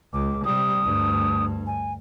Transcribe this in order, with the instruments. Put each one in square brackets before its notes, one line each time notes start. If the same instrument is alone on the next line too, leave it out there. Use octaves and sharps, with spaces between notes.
[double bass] C#2 [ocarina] D6
[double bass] C3 G3 [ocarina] D#6
[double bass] D2 G2
[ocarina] G#5